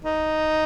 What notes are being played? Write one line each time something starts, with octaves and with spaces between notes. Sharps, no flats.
D#4